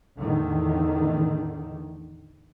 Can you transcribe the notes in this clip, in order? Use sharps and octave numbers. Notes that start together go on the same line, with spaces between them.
E2 A2 D3 D#3